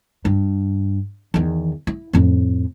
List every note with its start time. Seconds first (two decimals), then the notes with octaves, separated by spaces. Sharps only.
0.25 G2
1.34 E2 D#3
1.87 E4
2.13 F2 A2